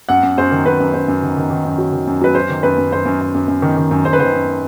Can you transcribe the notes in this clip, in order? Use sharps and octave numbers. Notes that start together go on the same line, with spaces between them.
F#2 F#5
F#2
F#2 C5
D#3
F#2 B4
F#2
F#2 C5
F#2
D#3
D#3
D#3
F#2
F#3
D#3
F#2
F#3 B4
F#2 C5
D#3
F#2 B4
F#2
F#2 C5
F#2
F#2
F#2
F#2
D#3
D#3
F#2
F#2 C5
B4
D#3 C5
F#2